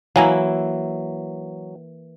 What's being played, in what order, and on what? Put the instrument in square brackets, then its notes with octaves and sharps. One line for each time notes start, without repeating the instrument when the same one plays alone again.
[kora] E3 A#3 E4 [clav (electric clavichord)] F#3 [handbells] F5 G#5 A#5